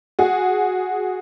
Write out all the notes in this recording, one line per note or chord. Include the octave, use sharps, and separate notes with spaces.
F#4 G#4